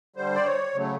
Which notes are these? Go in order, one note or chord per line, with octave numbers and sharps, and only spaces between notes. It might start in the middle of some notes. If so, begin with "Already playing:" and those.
D3 G3 C5
D5
C#5
C#3 F#3 A3